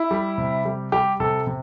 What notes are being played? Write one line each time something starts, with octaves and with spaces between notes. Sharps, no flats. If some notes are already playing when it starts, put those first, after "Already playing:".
Already playing: E4
G3
C3
G3
G3 G4
C3 A4
C3